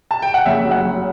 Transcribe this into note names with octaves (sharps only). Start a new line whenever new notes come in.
A5
G5
F#5
F#1 E5
F#3
F#5
F#3